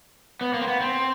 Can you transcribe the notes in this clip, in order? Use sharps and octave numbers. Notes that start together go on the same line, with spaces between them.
B3
A#3
C4
B3
C4